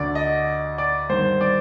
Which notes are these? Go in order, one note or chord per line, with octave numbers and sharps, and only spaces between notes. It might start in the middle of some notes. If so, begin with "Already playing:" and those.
Already playing: D2 D3 D5
D#5
D5
G2 D#3 C5
D5